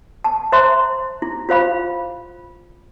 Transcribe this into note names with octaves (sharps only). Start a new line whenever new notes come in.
A5
C5 E5 A#5 C6
E4
F4 C5 F5 B5